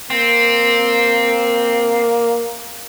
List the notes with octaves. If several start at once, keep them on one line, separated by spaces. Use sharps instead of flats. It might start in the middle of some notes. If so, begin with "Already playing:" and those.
A#3 C4